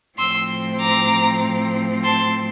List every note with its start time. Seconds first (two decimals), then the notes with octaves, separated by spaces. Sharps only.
0.18 A2 F3 C4 C6 E6
0.80 A#5 D6
2.04 A5 C6